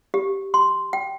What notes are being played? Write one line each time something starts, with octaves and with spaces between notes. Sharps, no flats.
G4
C6
G5